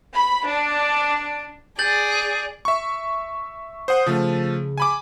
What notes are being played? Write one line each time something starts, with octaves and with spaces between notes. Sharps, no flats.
B5
D4
G#4 D5 G6 A6 F#7
E5 C#6
C5 F#5 D#6
C#3 F3 A3
G#5 B5 D6